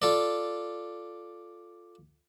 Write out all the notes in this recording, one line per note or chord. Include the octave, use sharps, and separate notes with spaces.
F4 A4 D5